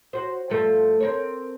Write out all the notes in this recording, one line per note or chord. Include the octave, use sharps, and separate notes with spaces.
F#4 C5
G2 F3 A3
C4 A#4 C#5